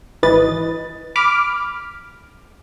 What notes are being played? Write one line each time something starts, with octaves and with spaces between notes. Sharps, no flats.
G#1 E3 B4 D#5 A6
B5 D6 F6